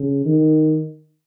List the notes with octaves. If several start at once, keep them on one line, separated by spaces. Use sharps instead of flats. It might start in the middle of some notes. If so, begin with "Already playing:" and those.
Already playing: C#3
D#3